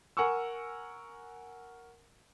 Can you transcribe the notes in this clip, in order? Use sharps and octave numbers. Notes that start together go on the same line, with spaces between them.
A#4 F#5 G#5 C#6 E6